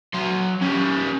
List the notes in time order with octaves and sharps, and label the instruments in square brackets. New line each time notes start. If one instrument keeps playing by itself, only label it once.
[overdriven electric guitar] F#3 C6
G3 C#4